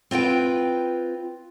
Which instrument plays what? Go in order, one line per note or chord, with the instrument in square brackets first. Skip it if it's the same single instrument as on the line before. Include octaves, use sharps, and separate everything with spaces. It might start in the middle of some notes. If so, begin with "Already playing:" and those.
[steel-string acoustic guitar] C4 F4 B4 G5